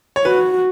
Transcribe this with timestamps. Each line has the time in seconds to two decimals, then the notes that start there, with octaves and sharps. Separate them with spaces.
0.16 C#5
0.24 F#4 B4